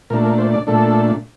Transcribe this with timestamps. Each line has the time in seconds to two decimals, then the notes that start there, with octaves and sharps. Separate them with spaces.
0.10 A#2 A3 D4 A#4
0.25 A#4
0.38 C5
0.54 D5
0.67 A#2 A3 D4 A4